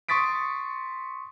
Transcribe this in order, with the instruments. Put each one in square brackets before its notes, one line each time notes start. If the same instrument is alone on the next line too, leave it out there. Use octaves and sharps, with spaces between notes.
[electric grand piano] C6 C#6 D#6 A6 B6 D7